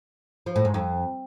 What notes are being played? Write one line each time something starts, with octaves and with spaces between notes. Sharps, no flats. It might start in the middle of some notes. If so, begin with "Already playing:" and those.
F3
A2
G#2
F2